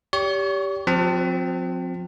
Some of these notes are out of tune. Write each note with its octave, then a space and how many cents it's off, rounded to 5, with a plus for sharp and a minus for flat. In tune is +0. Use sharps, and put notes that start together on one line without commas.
G4 +0 C#5 +45 C#6 +0
F3 +40 C4 -5 A5 +25